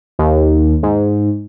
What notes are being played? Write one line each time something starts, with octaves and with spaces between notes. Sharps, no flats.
D#2
G#2